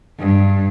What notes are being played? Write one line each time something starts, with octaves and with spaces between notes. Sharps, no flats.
G2